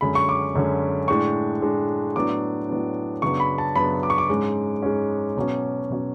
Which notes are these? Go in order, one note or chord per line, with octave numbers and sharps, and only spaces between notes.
F#2 D3 G#3 C#4 B5
C#6
D6
F#2 D3 G#3 C#4
A2 G#3 D4 C#6
A2 G#3 D4
A2 F#3 B3 D4 D6
A2 F#3 B3 D4
F#2 C#3 F#3 B3 D4 C#6
B5
A5
F#2 C#3 F#3 B3 D4 B5
D6
C#6
D6
G#2 G#3 C#4
G#2 G#3 C#4
B2 F#3 C#4
B2 F#3 C#4